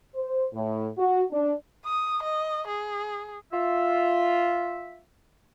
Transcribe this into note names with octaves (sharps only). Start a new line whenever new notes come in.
C5
A2
F#4
D4
D#6
D#5
G#4
F4 E5